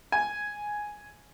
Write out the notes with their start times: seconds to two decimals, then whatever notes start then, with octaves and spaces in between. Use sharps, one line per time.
0.12 G#5